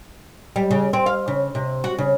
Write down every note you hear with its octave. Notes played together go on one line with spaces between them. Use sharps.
G3
C#3
C4
F5
C#3
C3
F#4
C#3